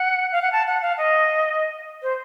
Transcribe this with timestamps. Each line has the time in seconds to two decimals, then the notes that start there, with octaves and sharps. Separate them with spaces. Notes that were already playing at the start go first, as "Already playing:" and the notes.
Already playing: F#5
0.32 F5
0.42 F#5
0.52 A5
0.67 F#5
0.82 F5
0.98 D#5
2.03 C5